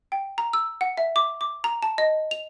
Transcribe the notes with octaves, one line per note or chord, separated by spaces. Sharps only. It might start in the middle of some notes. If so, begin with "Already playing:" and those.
G5
A#5
E6
F#5
E5
D6
D6
A#5
A5
D#5
F7